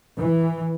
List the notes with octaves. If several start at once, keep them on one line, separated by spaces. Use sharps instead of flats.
E3